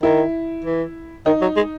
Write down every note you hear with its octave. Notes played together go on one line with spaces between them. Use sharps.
D#3 E4
E3
D#3 D#4
F#3
G#3